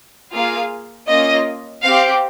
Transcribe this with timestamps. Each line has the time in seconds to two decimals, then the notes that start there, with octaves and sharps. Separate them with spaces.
0.32 A#3 F4 G#4 F5
1.07 A#3 C#4 F4 D#5
1.83 C4 G4 F5